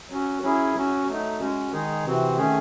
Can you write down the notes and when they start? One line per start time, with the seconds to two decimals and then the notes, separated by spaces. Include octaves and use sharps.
0.10 F#3 C#4 F#4
0.43 F#3 C#4 E4 G#4
0.75 F#3 C#4 F#4
1.07 F#3 A3 D#4
1.40 G#3 C#4 F#4
1.72 D#3 G#3 D#4 G#4
2.05 C3 E3 C4 F#4
2.37 D#3 A3 C#4 G#4